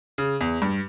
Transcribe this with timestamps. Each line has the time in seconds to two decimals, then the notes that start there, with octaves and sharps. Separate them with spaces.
0.18 C#3
0.41 E2
0.62 G2